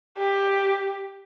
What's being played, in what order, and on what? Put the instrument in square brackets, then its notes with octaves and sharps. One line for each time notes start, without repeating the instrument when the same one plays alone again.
[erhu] G4